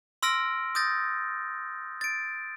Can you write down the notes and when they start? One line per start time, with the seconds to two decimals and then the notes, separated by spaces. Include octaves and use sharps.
0.23 C6 E6 F6 A#6 D7
0.75 D#6 G6 A6 A#6
2.01 A6 D7